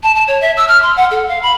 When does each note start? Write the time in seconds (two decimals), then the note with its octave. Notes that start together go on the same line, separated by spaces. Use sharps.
0.03 A5
0.15 A5
0.27 C#5
0.41 E5
0.56 E6
0.68 F6
0.82 C6
0.96 F#5
1.11 A4
1.28 F5
1.42 B5